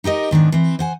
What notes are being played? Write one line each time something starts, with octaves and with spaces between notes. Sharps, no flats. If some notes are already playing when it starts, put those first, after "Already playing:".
D#4 G4 A#4 D#5
G#2 D#3 B3 D4
E3 C4
C5 F#5 G#5